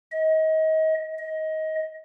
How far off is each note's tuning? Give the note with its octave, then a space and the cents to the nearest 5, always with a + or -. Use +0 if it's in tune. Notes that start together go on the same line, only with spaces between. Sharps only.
D#5 +30
D#5 +20